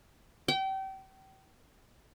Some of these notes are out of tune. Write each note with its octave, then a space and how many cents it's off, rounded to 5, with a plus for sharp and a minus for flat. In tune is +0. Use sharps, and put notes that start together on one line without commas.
G5 -30